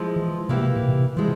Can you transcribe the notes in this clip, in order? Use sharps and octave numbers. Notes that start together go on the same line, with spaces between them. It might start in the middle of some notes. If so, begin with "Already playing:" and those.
Already playing: F3 G#3 E4
E3
C3 E3 A#3 E4 G4
A#2
C3
E3 F3 G#3 E4